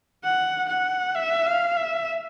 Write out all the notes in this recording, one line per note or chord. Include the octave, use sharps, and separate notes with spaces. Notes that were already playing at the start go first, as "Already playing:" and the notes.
F#5
F#5
E5
F5
E5